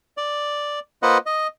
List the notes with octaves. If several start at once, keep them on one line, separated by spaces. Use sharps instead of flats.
D5
A#3 F4 B4 C5 D#5 F#5
D#5